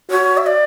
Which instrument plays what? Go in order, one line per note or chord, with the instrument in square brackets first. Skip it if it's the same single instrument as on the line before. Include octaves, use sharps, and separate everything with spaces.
[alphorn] F#4 [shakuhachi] C#5
[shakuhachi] E5
D5